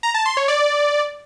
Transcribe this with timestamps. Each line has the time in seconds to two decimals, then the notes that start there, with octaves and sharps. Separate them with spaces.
0.03 A#5
0.14 A5
0.26 C6
0.37 C#5
0.48 D5